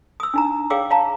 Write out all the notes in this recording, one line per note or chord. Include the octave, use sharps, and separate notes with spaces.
D#6 E6
D4 D#4 A#5
G#4 C#5 F5 G5 D6 E6
C#5 F5 A5 A#5